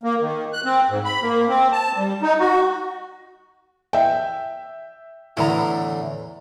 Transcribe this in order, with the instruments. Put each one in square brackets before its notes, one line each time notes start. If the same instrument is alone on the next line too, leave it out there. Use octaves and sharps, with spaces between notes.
[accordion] A#3
D#3
F#6
C4
G#2
B5
A#3
C4
A5
G3
D#4
F#4
[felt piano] E5 G5
[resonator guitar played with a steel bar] E2 A#5 [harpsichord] A2 D3 E3